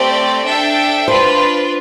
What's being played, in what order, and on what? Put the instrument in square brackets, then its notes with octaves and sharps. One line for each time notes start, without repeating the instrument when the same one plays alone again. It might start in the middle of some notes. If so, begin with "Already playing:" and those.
Already playing: [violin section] A3 C4 G4 D5 [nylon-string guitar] C5
[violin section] D4 A4 E5 G5
[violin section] D4 F4 B4 [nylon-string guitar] C5